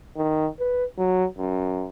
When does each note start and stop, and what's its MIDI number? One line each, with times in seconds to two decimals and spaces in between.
0.17 0.48 51
0.60 0.85 71
0.98 1.25 54
1.39 1.88 42